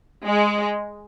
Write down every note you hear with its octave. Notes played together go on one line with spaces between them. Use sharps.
G#3